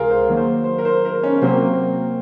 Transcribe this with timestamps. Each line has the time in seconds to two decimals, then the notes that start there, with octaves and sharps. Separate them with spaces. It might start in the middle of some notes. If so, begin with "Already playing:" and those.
Already playing: C#2 C3 G#3 F4 G#4 A#4
0.10 C5
0.29 D#3 F#3 A#3
0.37 C5
0.64 C5
0.78 A#4
0.85 C5
1.05 A#4
1.23 C#4
1.42 C3 F#3 A#3 C4